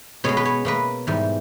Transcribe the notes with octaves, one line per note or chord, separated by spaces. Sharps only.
B2 G#3 B3 C#5
B4
C#5
B2 A#3 B4
G#2 E3 G3